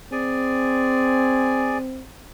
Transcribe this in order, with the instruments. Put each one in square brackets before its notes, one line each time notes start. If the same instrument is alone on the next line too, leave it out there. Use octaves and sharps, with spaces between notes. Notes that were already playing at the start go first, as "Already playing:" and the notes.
[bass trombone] C4 [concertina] G#4 D5 G#5